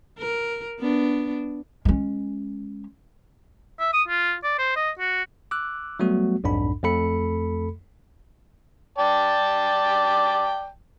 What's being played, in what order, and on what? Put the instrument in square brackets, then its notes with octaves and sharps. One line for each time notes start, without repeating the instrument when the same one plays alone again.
[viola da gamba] A#4
B3 D4
[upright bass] G#3 C#4
[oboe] E5
D#6
F4
D5
C5
D#5
F#4
[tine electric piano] D6 E6 F#6
F#3 G3 A3 B3 F#4
B1 F2 G#2 D4 B5
F2 A3 A4 B5 C#7
[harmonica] D5 G5 A5